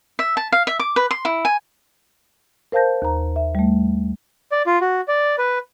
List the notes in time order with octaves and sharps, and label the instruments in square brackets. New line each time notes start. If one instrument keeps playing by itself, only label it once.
[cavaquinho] E5
A5
F5
E5
D6
B4
C6
E4
G#5
[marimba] A#4 C5 F5 A5 G6 A#6
D#2 A#5
E5
G3 A3
[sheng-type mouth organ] D5
F4
F#4
D5
B4